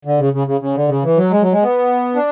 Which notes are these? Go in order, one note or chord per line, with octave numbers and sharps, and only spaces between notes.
D3
C#3
C#3
C#3
C#3
D3
C#3
E3
F#3
G#3
F#3
G#3
B3
D4